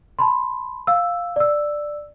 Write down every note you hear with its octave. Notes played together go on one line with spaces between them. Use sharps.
A5 B5 C6
F5 E6
D5 E6